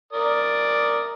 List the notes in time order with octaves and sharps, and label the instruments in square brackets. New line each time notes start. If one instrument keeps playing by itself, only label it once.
[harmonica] A#4 D5 D#6